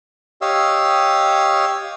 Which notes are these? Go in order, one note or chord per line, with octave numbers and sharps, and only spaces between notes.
G4 C#5 D#5 F5 E6